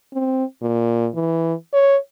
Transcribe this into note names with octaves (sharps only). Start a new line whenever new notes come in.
C4
A#2
E3
C#5